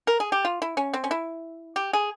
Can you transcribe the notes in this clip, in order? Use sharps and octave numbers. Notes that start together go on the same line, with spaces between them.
A#4
G#4
G4
F4
E4
C#4
C4
C#4
E4
G4
G#4